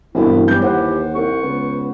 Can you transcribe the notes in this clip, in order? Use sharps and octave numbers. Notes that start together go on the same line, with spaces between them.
C2 G2 B2 E3 E4
E2 E3 G3 G4 G6
D#2 C5 F#5
C2 C#6
C#2 B3